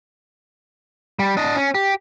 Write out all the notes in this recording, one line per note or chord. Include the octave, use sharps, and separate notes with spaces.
G3
D4 D#5
C#4
G4